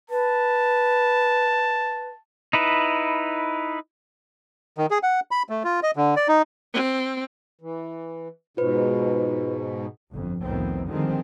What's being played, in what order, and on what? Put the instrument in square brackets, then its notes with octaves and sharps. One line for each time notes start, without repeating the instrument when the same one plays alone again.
[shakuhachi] B4 [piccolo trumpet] A5
[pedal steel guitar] D#4 E4 B4
[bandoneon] D#3
G#4
F#5
B5
A3
F4
D#5
D3
D5
D#4
[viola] C4
[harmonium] E3
[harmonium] G#2 B2 [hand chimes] F4 B4 C5
[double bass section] G1 F2
C2 F2 A2 D#3 B3 C4
D3 D#3 F3 G3 G#3 C4